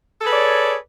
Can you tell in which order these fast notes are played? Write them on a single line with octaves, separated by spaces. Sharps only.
A4 G#4 B4 D5 C#5